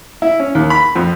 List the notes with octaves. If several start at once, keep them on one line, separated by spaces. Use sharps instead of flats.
E4
C#4
D#2
B5
F2